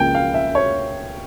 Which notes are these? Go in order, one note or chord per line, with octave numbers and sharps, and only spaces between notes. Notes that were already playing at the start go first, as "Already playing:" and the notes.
Already playing: C#2 C#3 F3 A#3 G5
F5
E5
C#5